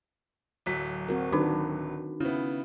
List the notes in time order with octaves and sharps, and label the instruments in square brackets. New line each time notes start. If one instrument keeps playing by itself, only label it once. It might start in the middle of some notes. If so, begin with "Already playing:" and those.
[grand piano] D1 F#3 B6
[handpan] C4 F#4 A#4
[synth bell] D#3 D#4 F#4 [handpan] D4
[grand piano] C#3 B3 [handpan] E4